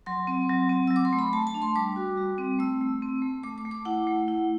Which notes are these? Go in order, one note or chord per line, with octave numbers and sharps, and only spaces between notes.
F#3 C6
C4
F#3
C4
F#3 E6
D6
C6
A3
B5
A3 A5
A5
D4
C6
G3 D6
F#4
G3
C4
A3 E6
A3
C4
A3
A3 D6
D6
A3
D6
E4 F#5
A3
E4